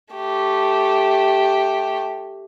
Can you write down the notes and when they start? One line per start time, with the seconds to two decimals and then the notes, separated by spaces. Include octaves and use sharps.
0.14 A3 G4